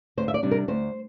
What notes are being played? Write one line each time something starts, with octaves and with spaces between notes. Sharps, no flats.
D2 C5
E5
D5
C3 G3 D4
A#4
D2 C5